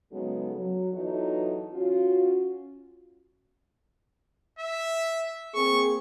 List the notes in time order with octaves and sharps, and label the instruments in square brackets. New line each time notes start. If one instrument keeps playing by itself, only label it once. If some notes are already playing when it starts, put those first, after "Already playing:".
[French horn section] C#3 F#3 G#3 B3 D#4 A4
F#3
E2 E3 F#3 D#4 F4 A4
C#4 F4 F#4
[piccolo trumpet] E5
[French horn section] A#3 C4 G#4 [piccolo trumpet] C#6